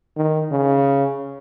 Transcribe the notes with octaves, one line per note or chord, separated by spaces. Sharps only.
D#3
C#3